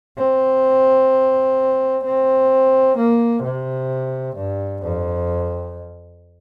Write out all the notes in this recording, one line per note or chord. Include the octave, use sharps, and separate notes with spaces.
C4
C4
A#3
C3
G2
F2